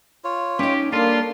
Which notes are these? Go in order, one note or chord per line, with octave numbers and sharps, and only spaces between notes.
F4 C#5
C#4 D#4 G4
G3 A#3 D4 F4 A4 C6